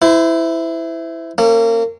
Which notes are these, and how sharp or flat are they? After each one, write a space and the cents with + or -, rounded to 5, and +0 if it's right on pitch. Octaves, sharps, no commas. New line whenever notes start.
E4 +0 C5 -35
A#3 -30 C#4 -35